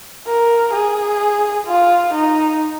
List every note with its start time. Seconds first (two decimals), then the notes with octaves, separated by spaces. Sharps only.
0.27 A#4
0.73 G#4
1.67 F4
2.14 D#4